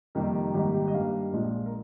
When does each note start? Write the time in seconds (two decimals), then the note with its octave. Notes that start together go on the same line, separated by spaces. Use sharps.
0.15 F2 C3 D#3 G3 A#3 A#4
0.54 G#1 G#2 G3 A#3 G4
0.74 G4
0.88 D#5
0.94 G2 G3 A#3 F5
1.33 A#1 A#2 F3 G#3
1.66 A#4